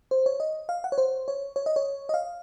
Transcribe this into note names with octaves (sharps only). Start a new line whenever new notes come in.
C5
C#5
D#5
F5
F#5
C#5
C5
C#5
C#5
D#5
C#5
D#5
F5